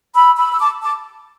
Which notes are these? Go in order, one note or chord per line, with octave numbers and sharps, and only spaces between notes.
B5 E6
B5 E6
E6
A5 D6
A5 D6